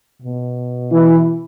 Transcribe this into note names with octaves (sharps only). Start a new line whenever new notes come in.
B2
E3 E4